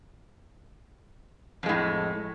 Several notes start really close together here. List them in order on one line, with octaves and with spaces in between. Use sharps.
F2 G#3 A2